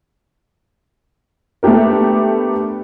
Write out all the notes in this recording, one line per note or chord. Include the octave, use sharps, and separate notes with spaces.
A3 B3 D4 G4 A#4